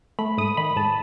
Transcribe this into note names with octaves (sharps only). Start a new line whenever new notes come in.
A3 B5
G#2 D#6
D#3 B5
G#2 A5